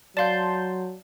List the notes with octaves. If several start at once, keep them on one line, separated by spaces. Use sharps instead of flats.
F#3 D5 F5 A5 C6 G6